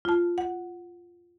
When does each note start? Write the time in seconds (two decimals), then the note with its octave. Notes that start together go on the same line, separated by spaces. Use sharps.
0.05 F4 A5
0.38 F#5